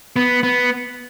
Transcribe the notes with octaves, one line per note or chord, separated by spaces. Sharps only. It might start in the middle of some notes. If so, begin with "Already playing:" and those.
B3
B3